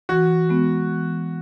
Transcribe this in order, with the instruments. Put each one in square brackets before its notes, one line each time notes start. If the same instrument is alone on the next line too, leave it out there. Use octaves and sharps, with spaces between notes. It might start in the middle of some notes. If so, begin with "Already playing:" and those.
[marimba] E3 [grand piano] F#4
[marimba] G#3 B3
E3